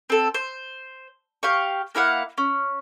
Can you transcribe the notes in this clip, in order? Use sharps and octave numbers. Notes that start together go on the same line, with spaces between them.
C4 A4
C5
G4 F5 C#6
A#3 E4 F5 F#5
C#4